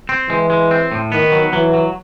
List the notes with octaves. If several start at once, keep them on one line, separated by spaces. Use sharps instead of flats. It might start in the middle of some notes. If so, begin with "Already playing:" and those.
C4
E3 G#3
G#3
C4
A2
D#3 B3
F#3
E3 F#3
F#3